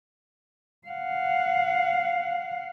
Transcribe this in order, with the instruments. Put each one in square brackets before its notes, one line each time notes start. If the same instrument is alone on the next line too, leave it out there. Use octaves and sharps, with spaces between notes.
[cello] F5 F#5